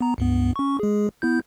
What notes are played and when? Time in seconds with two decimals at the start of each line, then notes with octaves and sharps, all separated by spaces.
0.01 B3 A#5
0.18 C#2 G2 B3
0.56 C#4 C#6
0.80 G#3 G#4
1.22 B3 E4 G6